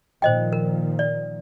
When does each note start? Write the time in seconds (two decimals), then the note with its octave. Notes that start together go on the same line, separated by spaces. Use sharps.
0.22 A#2 D#3 F3 C5 D#5 G5
0.53 A#4
0.99 D5